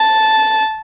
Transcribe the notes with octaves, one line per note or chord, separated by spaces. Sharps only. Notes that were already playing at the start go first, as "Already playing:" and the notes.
Already playing: A5